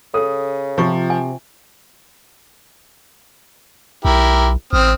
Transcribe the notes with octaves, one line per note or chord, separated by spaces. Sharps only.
C#3 A4 D#6
C3 F3 F4 C#6
G#5
B1 E4 G4 A#4
A1 C4 D#6 F6